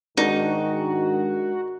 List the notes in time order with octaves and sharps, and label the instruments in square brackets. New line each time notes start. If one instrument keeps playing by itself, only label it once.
[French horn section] G#2 D#3 [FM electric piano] G#3 D4 A#4 [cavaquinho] D#4 [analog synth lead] F#4